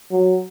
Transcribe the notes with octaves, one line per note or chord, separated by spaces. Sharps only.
F#3